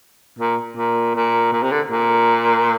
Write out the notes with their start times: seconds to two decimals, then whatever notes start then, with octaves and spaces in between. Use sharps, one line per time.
0.39 A#2
0.77 A#2
1.16 A#2
1.53 A#2
1.63 C3
1.72 D3
1.91 A#2